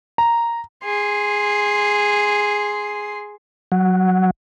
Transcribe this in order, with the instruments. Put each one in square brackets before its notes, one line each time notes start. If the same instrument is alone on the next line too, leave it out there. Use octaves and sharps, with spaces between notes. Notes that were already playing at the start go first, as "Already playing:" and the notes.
[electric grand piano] A#5
[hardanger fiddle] G#4 C6
[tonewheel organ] F#3 F#5